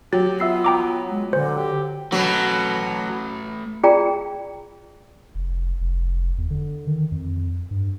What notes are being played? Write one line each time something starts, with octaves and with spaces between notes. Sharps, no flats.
F#3 G4 A6
B3 F4 E5 E6 C7
G5 A#5 D6
G#3
A#2 D3 C5
G4
B2 F#3 A3 B4
F4 G#4 D5 G5 A#5
F1
F1
E2
D3
D#3
F2
G2